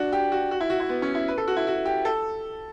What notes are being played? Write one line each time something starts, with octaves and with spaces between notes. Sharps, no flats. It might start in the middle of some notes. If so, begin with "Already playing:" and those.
Already playing: D4 F#4
G4
F#4
F#4
E4
F#4
E4
B3
C#4
E4
B4
A4
F#4
E4
F#4
G4
A4